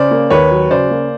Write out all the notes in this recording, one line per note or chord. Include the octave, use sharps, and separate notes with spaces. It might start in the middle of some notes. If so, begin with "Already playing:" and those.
Already playing: C#3 C5 D5
A#3
D#2 B4 C#5
F#3
C#3 C5 D5
A#3